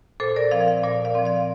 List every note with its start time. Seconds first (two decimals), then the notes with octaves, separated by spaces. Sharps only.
0.20 A#2 A4 C5
0.36 A#4 D5
0.51 F3 C4 D5 F5
0.67 D5 F5
0.83 A#2 A#4 D5
1.05 D5 F5
1.15 F3 C4
1.25 D5 F5